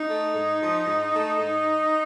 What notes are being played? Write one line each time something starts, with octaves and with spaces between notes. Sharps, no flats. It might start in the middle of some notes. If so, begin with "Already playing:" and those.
Already playing: D#4
A3
G#2
F3
G#2
A3
G#2